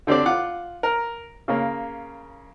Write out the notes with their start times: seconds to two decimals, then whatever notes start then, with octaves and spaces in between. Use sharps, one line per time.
0.07 D3 C4 D4 G4 D5
0.26 F4 F#5 D6
0.83 A#4
1.48 C#3 A#3